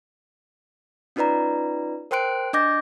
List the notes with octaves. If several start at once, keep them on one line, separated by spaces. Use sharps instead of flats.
C#4 D#4 F4 B4 D5 A#5
A#4 C5 G5 C6 F#6 D7
D4 D#5 D6 G6 A#6